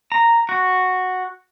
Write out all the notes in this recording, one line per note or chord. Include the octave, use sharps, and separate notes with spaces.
A#5
F#4